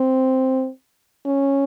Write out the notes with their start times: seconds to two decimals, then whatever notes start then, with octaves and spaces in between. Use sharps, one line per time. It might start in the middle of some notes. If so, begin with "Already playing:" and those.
Already playing: C4
1.26 C#4